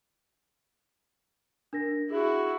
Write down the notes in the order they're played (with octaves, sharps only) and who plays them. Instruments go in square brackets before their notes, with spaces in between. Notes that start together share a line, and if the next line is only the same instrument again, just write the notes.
[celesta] D4 A#4 A#6
[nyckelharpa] E4 F#4 [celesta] G#4